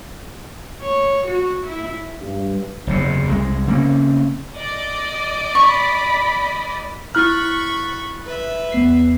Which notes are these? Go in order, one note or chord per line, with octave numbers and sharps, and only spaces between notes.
C#5
F#4
E4
G2
F#1 E2 C3
C2 G#3
C#3 A#3 C4 C#4
D5 D#5
B5 C#6
E4 B5 C#6 F6 F#6 A6
B4 E5
E2 B3 C7